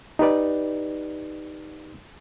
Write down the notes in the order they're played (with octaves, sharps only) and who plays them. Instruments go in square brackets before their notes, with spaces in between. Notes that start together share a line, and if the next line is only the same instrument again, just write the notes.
[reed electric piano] D#4 G4 B4 D5